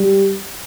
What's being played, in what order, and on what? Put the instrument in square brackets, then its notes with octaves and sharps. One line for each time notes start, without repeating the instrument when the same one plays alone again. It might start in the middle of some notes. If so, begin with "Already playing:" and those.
Already playing: [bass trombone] G3